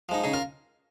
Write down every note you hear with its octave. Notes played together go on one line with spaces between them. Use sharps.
F3 G#3 D#4
C#3 D#4 G#4
F4 A#4